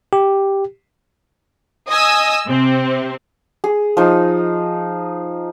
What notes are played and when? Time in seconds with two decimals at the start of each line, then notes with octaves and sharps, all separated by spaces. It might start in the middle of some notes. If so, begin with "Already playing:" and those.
0.13 G4
1.89 D#5 G#5 D#6 E6
2.49 C3 C4
3.64 G#4
3.97 F3 D#4